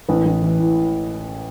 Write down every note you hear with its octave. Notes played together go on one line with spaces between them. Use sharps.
A1 B4
A1
E3
A2